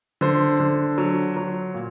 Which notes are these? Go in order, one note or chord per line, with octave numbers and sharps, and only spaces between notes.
D3 C5
D3
F#3
F#3
A#2